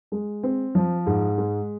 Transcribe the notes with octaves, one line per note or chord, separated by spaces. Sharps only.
G#3
C4
F3
G#2
G#3